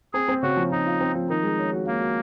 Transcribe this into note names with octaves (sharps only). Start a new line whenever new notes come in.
C4 G#4
C4
C#3 F#4
F3
F3 D#4
F4
C4
F3
D#3 D#4
G#3
C#4
F#4
A#3 C#4
F#4